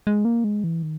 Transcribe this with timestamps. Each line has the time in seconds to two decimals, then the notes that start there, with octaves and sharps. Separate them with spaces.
0.07 G#3
0.25 A#3
0.44 G#3
0.64 E3
0.83 D#3